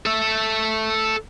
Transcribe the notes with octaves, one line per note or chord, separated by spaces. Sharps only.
A4 E5